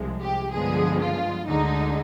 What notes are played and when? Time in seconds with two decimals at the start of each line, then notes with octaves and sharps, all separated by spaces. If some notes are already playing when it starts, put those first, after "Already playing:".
Already playing: C2 C3 F3 G#3
0.21 G4
0.52 G2 D3 F3 G#3 B3 G#4
1.01 F4
1.47 D2 D3 G#3 D#4